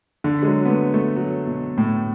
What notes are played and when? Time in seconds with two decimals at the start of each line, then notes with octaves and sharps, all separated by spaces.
0.24 D3
0.42 G#3
0.47 F#3
0.65 B3
0.70 A3
0.94 A3
1.16 F#3
1.47 B2
1.78 A2